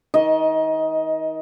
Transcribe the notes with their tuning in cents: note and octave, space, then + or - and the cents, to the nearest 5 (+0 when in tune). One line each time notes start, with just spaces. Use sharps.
D#3 +30 D#5 +10